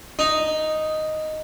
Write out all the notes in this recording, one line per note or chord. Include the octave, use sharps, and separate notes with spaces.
D#4